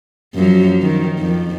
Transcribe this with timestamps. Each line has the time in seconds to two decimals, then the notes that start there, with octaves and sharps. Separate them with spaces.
0.34 F#2 F3 F#3
0.82 D#3
1.19 F2